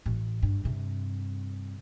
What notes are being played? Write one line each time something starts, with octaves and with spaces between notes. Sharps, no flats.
A1
G2
G2 C3